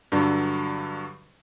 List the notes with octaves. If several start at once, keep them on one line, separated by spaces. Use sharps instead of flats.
G2 D3 F#3